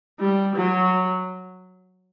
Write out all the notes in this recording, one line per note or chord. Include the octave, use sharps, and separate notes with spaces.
G3
F#3